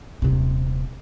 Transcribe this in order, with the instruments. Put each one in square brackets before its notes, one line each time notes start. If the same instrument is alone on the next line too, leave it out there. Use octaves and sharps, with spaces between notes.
[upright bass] D#1 C3